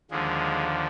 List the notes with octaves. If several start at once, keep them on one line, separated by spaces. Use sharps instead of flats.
D#2 D3 F3 G#3